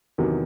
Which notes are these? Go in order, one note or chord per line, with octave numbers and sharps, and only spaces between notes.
E2 C3 D#3 F#3